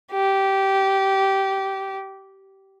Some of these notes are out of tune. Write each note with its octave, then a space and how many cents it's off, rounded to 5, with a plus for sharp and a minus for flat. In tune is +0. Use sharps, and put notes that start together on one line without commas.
G4 -15